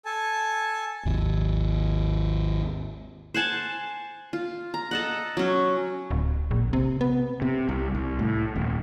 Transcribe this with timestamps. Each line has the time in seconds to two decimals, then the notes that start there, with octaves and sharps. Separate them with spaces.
0.05 A4 G#5 A5
1.05 G#1 D#2
3.34 C5 F#5 G#5 A5
4.33 F4
4.74 A#5
4.91 A4 D#5 F#5
5.37 F#3 C#4
6.11 D1
6.51 A#1
6.73 C3
7.01 B3
7.42 C3
7.69 C2
7.95 C2
8.19 A2
8.55 D#1